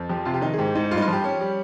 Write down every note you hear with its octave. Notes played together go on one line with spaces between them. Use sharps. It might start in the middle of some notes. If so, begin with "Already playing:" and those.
Already playing: F2
F3 G4
C3 F4
G4
D#3 D#4
G#4
G#2 G4
G#2 D#4
G2 F4
D#4
F4
F3 G4
C#4
G3